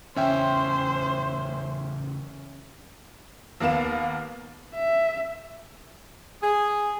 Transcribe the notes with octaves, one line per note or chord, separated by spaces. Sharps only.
E2 C#3 E3 C#4 C5 E5 G5
D#2 A#3 B3 F5 E7
E5
G#4